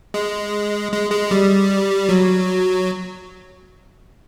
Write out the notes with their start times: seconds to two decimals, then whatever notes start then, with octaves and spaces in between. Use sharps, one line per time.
0.14 G#3
0.92 G#3
1.11 G#3
1.31 G3
2.09 F#3